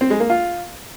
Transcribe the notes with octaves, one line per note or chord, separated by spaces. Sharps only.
C4
G#3
A#3
F4